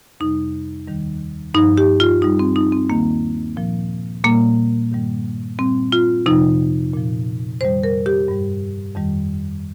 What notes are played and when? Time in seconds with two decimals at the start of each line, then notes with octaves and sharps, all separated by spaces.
0.20 F2 C3 G3 D#4
0.88 D#2 D#3 G3
1.54 G2 F3 D#4
1.78 G4
2.00 F4
2.22 G2 G3 D#4
2.39 C4
2.56 D#4
2.72 C4
2.90 D#2 D#3 G3 A#3
3.56 A#2 F3
4.24 A#2 G3 A#3
4.91 G2 D#3 G3
5.59 A#2 G3 C4
5.92 F4
6.26 F2 C3 F3 D#4
6.94 A#2 F3
7.61 F2 D#3 G3 C5
7.83 A#4
8.06 G4
8.28 G2 G3
8.95 F2 D#3 G3